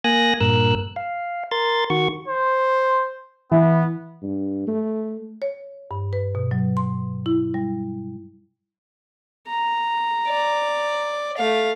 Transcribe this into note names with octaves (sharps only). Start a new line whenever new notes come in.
A#3 G#5 D#6 F#6 A#6
G2 A#2 A#4 E6 F#6
F5
A#4 C6 A6
D#3 F#4 C#6
C5
E3 B3
G2
A3
C#5
G2
B4
B2
F#3
C6
E4
G3
A#5
D5
A3 F5